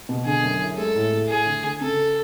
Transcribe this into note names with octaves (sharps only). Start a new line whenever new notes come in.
B2
D3 G#4
F#2
E4
G#3 A4
A2
A2
A3 G#4
D3
D3
C#3 A4